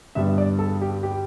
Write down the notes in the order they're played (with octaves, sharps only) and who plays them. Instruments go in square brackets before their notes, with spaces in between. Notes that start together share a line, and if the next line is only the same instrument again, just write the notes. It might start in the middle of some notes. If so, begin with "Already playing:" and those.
[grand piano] G2 D3 G3 B3 E5
D5
A4
G4
G4